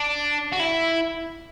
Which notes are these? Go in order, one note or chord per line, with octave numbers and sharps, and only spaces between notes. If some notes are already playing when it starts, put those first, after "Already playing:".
Already playing: D4
F#4
E4